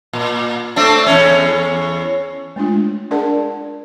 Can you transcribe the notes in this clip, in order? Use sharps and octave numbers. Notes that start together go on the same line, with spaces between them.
A#2
A3 C4 D4
E2 C#4
G#3 A3 D4 F4
D4 G#4 A#4 D5 F#5 A5